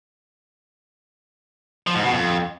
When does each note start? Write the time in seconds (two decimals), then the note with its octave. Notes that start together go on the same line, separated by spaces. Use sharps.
1.87 F3
1.95 G#2
2.03 B2
2.12 F2